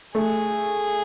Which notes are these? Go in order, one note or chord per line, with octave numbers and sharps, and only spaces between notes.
A3 G#4